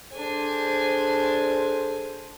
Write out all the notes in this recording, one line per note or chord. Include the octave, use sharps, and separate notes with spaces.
D4 G#4 A4 C5 G#5